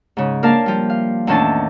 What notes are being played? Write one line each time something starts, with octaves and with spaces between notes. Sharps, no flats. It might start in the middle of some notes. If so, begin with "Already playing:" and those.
G#2 C#3
A#3 D4 A#4 D5 F5 A5
F3 G3
F5
E2 A2 D#3 C#4 D4 A5